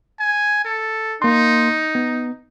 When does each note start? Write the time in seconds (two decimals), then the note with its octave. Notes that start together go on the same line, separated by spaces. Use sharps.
0.20 G#5
0.65 A4
1.22 A#3 D#4 C6
1.95 B3